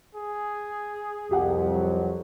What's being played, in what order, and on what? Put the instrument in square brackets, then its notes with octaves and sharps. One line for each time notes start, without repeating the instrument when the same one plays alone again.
[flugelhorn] G#4
[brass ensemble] C2 F2 [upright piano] G4 F#5
[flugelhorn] F#3